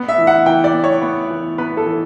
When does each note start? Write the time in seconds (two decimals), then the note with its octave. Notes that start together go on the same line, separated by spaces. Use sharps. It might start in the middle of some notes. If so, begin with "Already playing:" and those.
Already playing: B3
0.08 E5
0.18 E3
0.27 F#5
0.46 E3 G5
0.64 D5
0.74 B3
0.84 C#5
1.02 B3
1.30 E3
1.58 B3 B4
1.77 A4
1.86 E3